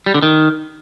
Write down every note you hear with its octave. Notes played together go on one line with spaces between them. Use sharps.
G3
D3
D#3